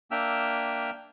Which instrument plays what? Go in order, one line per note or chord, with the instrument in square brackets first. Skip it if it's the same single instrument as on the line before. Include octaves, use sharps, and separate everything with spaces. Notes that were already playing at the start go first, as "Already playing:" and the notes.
[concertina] A#3 D4 E5 G5 E6 F6